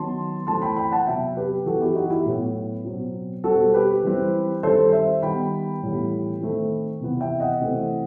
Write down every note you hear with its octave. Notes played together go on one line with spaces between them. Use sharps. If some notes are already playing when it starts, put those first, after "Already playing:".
Already playing: D#3 F#3 B3 A5 C6
E3 A3 C4 A5 C6
G5 B5
G5 B5
F#5 A5
C3 F#3 B3 E5 G5
G4 B4
E3 B3 F#4 A4
E4 G4
D#4 F#4
E4 G4
A2 F#3 B3
B2 F#3 C4
B2 G3 C4 F#4 A4
G4 B4
E3 G3 C4
D#3 G3 C4 A4 C5
C5 E5
D#3 G3 B3 G5 B5
A2 E3 G3 B3
D#3 A3 C4
C3 E3 B3
E5 G5
D#5 F#5
C3 E3 A3 C4